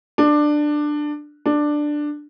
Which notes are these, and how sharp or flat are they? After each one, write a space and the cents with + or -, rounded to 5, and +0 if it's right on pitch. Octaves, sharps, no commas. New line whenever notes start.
D4 +15
D4 +10